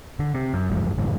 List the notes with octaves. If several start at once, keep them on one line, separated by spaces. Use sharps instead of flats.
D3
C3
F#2
F#1 E2 G#2 F3
F1 G#2 C#3 E3